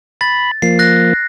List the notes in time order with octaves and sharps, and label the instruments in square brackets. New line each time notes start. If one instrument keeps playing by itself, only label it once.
[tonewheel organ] B5 [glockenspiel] A6
[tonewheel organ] F3 A#3 [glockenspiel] C7
[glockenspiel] F#6 A#6